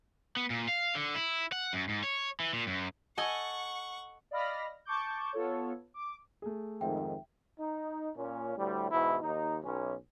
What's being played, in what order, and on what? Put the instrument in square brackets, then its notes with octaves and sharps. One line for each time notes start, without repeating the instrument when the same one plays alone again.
[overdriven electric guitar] B3
A#2
F5
D3
E4
F#5
F#2
G#2
C#5
E3
A#2
F#2
[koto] A4 D#5 G#5 [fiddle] F#5 C#6
[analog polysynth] D5 D#5 F5 B5 F6 A#6
A5 C#6 D6 G6
B3 F4 A4 C#5
D6
[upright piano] A3 G#4
[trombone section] F2 G#2 D#3 [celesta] E5 G5
[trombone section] D#4
A#2 C#4
D2 A2 G3
G#2 B2 E3 E4
D#2 D#4
B1 C#4